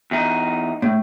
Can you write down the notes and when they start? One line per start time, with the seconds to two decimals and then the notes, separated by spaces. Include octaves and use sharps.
0.11 E2 D#4
0.82 A2